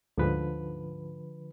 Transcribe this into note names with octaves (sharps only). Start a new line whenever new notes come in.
D2 G#2 D3 F3 B4